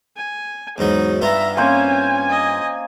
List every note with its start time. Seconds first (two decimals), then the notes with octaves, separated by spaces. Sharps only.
0.17 G#5
0.78 E2 G#2 F#3 D#4
1.21 G2 B3 F4 E5 A#5
1.57 A#3 C4 C#4 C5 G#5
2.30 D#5